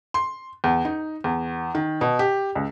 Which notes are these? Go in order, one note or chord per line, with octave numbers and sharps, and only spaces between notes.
C6
E2
D#4
E2
D#3
B2
G4
C#2